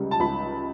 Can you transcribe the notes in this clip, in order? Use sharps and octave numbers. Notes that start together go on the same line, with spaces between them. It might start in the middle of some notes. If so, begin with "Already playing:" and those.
Already playing: C#2 C#3 G3
A5
C#2 B5